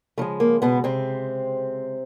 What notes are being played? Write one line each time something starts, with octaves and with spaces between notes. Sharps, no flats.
C#3 F3 G#3 A3
A#3
B2 B3
C3 C4